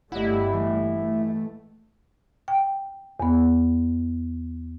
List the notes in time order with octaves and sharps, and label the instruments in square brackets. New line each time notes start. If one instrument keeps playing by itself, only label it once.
[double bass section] G1 G3 A3 [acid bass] E4 [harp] D#5 F#5
[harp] A2 E3
[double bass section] A3
[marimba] G5
E2 B3